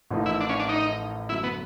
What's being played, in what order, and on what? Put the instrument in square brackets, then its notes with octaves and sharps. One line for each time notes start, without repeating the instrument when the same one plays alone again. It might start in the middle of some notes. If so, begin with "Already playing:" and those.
[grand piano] A1 A2 F3 A#3 D#4
[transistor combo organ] E4
D4
C#4
D4
D#4
[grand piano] F#2 D3 F#3 A3 [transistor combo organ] E4
[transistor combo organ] B3